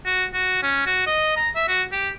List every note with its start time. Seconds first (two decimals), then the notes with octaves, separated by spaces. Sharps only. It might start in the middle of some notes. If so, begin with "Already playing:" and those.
0.05 F#4
0.34 F#4
0.63 C#4
0.86 F#4
1.06 D#5
1.37 A#5
1.55 E5
1.68 F#4
1.92 G4